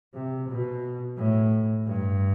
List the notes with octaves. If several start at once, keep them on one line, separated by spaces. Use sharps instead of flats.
C3
B2
A2
G2